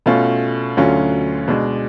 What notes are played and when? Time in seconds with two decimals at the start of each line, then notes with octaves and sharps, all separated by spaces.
0.06 B2 A3 C#4 F4
0.77 D2 D3 F#3 C#4 F4
1.48 B2 G#3 D4